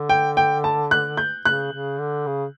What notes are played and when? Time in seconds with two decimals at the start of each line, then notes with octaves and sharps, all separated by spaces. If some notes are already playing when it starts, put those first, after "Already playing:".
Already playing: D3
0.09 G5
0.37 G5
0.64 A5
0.91 F#6
1.17 G6
1.45 C#3 F#6
1.73 C#3
2.00 D3
2.27 C#3